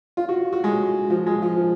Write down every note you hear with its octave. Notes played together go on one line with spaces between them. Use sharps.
F4
F#4
F#4
G#3
F3
G#3
F3
F3